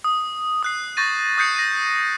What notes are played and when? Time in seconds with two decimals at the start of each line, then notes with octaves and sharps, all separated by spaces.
0.04 D#6
0.63 D#6 F#6 C7
0.97 C#6 G6 A6 A#6 D#7
1.38 D#6 F#6 G6 C7 C#7
1.56 A#6 D#7